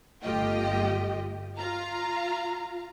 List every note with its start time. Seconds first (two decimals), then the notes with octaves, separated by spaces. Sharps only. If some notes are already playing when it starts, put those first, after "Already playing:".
0.22 G1 A3 F4 G4 D#5 G5
1.58 F4 F5 A#5